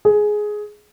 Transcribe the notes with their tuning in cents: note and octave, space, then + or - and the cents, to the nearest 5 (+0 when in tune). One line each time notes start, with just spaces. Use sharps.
G#4 +10